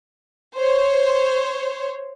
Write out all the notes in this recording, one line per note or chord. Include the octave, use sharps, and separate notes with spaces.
C5 C#5